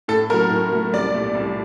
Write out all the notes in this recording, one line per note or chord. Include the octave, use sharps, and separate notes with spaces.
A2 A4
F#3 A3 A#4
A2
F#3 A3
C2 D5
A#2 A3
C2